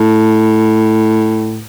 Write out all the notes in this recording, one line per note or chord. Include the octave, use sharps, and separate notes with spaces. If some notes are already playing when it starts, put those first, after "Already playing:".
Already playing: A2